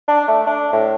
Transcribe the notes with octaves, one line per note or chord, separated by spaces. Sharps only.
D4
A3
D4
A2